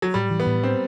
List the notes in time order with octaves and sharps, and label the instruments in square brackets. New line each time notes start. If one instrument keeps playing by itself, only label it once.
[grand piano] F#3
[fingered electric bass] A2 [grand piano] G3
[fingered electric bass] E3
[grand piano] B3
[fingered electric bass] A2
[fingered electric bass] B3 [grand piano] C4